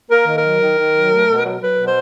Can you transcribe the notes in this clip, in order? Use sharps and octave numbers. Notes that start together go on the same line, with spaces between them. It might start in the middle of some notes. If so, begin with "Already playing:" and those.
A#3 A#4
D#3
A#4
F#3
D#3
D#3
F#3
A3
B2
F#3
F#3 B4
B2
C5